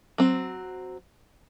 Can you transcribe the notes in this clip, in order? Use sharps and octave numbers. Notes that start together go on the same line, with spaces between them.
F#3 C4